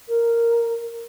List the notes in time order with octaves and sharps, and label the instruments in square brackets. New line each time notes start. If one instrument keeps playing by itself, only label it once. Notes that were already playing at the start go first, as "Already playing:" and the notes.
[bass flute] A#4